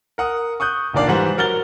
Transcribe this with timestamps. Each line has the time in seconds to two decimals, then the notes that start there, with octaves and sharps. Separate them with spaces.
0.18 A#4 F#5 D#6
0.60 C#6 D#6 F#6 G6
0.93 F1 A#2 D#3 D4 D5 F5
1.08 G#2 E3 G3 C5 F#5 F#7
1.37 F#3 A#4 F#5 F6 A6 G7